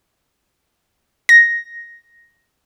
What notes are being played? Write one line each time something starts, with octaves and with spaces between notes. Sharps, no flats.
A#6